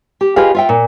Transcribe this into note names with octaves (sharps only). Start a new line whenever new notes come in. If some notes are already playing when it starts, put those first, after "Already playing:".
G4
F4 G4 G#4 B4 D#5 F5
F4 E5 G5
A#2